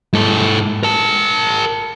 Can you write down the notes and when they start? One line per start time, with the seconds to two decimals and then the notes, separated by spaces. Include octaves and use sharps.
0.13 G#2 A4
0.83 A#4 A5